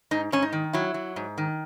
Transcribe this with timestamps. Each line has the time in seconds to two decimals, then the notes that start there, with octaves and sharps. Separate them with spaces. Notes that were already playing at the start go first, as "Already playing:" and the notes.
0.11 G#2 D#4
0.32 G#2 C#4
0.42 D#4
0.53 D#3
0.73 F#3 E4
0.94 F#3
1.16 G#2
1.38 D#3